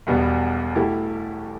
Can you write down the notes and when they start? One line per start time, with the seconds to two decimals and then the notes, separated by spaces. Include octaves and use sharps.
0.07 E1 E2 B2 G3 B3
0.75 B2 A3 E4 G4